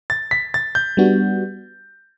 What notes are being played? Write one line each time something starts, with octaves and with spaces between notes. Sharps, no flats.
A6
B6
A6
G6
G3 B3 D4 F#4